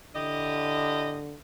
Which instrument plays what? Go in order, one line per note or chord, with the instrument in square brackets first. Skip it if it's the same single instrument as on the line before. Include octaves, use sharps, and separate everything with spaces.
[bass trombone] D3 [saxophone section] E4 G4 D#5